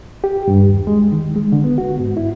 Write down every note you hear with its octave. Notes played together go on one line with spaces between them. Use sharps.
G4
G2
D#2
G#3
D#3
G#3
D3
B3
F#4
G#2
E4